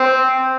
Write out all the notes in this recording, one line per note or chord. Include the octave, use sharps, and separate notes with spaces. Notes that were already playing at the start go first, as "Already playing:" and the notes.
Already playing: C4